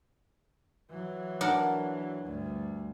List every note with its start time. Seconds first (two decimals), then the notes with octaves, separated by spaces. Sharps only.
0.90 E3 F#3
1.41 D4 A#4 F#5
2.23 D2 G2